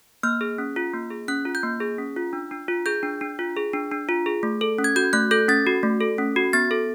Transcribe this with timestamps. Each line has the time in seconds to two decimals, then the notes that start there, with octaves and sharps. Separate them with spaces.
0.23 A#3 F6
0.41 G#4
0.58 C#4
0.76 F4
0.93 A#3
1.10 G#4
1.28 C#4 F#6
1.45 F4
1.55 G6
1.63 A#3
1.80 G#4
1.98 C#4
2.16 F4
2.33 D4
2.51 D4
2.68 F4
2.86 G#4 G6
3.03 D4
3.21 D4
3.39 F4
3.56 G#4
3.73 D4
3.92 D4
4.09 F4
4.26 G#4
4.43 A3
4.61 A4
4.78 C#4
4.84 G#6
4.96 F#4 G6
5.13 A3 F#6
5.31 A4 G6
5.48 C#4 A6
5.67 F#4
5.83 A3
6.01 A4
6.18 C#4
6.36 F#4
6.53 B3 A6
6.71 A4